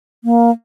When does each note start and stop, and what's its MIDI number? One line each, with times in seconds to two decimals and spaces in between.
0.24 0.51 58